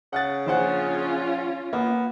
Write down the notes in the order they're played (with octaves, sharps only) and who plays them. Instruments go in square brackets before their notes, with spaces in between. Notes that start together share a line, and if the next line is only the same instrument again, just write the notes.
[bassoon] C#3 [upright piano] F#5 F#6 A6
[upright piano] A#1 C5 F#5 [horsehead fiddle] C#4 F4
[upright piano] A#3 [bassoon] B3